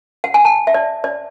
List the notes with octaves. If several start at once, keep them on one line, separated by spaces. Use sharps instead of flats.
F#5
G#5
A5
E5
D5
D5